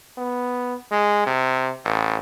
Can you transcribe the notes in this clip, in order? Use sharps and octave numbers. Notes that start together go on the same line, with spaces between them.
B3
G#3
C3
A1